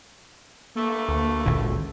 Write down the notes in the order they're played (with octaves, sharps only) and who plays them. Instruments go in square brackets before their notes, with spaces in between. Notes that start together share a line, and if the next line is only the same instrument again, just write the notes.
[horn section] G2 A3 [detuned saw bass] A#3
[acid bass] D2
[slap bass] G#1 A#2 D3 [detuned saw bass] C#2